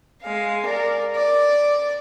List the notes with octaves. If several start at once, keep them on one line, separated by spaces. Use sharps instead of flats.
G#3 F5
A#4 D5
D5